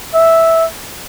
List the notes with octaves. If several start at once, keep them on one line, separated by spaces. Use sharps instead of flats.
E5